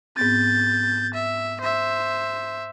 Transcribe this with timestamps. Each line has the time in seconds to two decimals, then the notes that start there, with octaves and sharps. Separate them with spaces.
0.17 G#2 B3 C4 G6 A6
1.14 E5
1.61 C5 E5